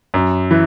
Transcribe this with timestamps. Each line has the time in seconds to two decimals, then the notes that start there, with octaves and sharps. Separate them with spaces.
0.14 F#2
0.51 E3